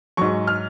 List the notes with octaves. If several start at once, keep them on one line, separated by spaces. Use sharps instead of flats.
G#2 F#3 C#6
F6